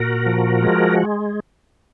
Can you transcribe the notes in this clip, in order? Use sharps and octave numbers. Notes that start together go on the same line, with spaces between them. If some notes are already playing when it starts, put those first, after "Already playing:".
Already playing: A#2 F#4 A#4
F3
G#3